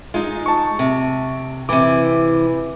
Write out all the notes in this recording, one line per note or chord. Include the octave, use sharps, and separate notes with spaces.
G#3 D#4 F4
A5 C#6
C3
C3 E3 D6 D#7